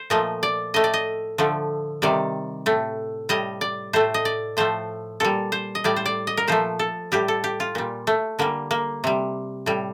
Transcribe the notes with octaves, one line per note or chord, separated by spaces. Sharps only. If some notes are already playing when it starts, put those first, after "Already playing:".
Already playing: C5
A#2 F3 A3 D#5
D5
A2 A3 D#5
D5
D#5
D3 F3 A3
C3 D#3 G3 D5
A2 A3
A2 G3 D#5
D5
A2 A3 C5
D#5
D5
A2 F3 A3 C5
A#2 G3 A4
C5
D#5
A2 G3 D5
C5
D5
D#5
A#4
A#2 F3 A3 C5
A4
A2 G3 G4
A4
G4
F4
A#2 G3
A3
D3 G3 A#3
A#3
C3 G3
A2 G3